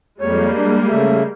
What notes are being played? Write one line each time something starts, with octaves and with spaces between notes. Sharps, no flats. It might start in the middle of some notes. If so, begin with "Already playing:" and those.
F2 G3 G#3 A#3 C#5
D4
C#3 A3 E5